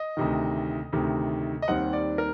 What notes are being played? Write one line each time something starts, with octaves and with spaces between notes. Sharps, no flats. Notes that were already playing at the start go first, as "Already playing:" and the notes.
Already playing: D#5
D2 C3 D#3
D2 C3 D#3
D#5
D#2 D#3 G3 C4 F#5
D5
A#4